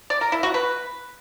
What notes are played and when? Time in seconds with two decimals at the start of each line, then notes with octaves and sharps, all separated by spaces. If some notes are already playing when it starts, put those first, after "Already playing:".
0.10 D5
0.21 A#4
0.32 E4
0.43 F#4
0.54 B4